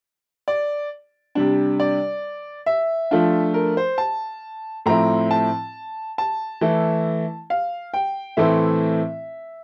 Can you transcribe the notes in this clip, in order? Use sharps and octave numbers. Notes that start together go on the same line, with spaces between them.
D5
C3 G3 D4
D5
E5
F3 A3 D4 F4
A#4
C5
A5
A2 F3 C4 E4 A#5
A5
A5
E3 A3 E4
F5
G5
A2 E3 A3 C4 E4 E5